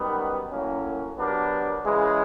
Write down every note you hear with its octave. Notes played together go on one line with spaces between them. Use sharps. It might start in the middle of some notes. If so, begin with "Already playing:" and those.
Already playing: F#2 D#3 G3 B3
A2 F#3 A#3 C#4
F#3 B3 D4 G4 A#4
C#3 E3 G#3